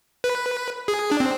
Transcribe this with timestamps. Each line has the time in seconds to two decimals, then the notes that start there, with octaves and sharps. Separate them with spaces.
0.24 B4
0.88 G#4
1.11 D4
1.20 C4